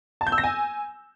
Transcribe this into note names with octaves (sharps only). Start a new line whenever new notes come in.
A5
G6
E6
A#6
G#5